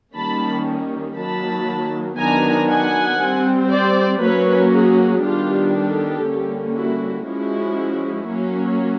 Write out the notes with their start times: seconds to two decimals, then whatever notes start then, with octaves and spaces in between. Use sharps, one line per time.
0.14 D#3 G3 A#3 C#4 A5 B5
1.16 D#3 F#3 A#3 A5 B5
2.18 D#3 F#3 B3 D4 G#5 A#5
2.68 F#5 G#5
3.19 G3 C4
3.70 C5 D5
4.20 F#3 A#3 C#4 B4 C#5
4.71 F#4 G#4
5.22 D#3 G3 B3 D4 F4 G4
5.72 G4 A4
6.24 D3 G3 A#3 C#4
6.74 E4 F#4
7.24 F3 G#3 C#4 E4 F#4
8.27 F#3 A#3 C#4